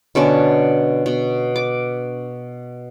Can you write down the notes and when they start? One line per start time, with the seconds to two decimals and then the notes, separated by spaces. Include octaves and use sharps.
0.15 B2 D3 C#4 A5
1.06 B2
1.56 D6